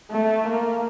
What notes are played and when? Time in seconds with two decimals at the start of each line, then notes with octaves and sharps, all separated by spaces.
0.12 A3
0.48 A#3